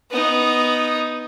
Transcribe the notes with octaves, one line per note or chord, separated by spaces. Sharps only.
B3 D#4